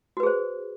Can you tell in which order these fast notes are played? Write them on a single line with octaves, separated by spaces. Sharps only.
F#4 B4 G#4 C5